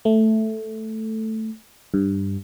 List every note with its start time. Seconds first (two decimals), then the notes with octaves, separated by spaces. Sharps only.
0.05 A3
1.94 G2